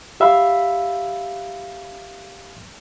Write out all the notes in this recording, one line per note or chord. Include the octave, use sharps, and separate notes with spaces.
G4 E5 F5 B5